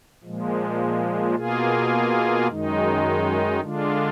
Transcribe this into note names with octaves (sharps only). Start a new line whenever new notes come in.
A#2 F3 G#3
B2 A#3 F4 G#4
F#2 D#3 G#3 D#4
D3 G#3 D4 F4